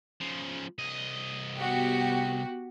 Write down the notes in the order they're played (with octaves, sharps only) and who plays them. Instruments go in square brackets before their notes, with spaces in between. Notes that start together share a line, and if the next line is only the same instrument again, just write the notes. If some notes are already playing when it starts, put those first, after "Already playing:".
[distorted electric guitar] C#3 F3
C2 D#5
[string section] B3 F#4 G4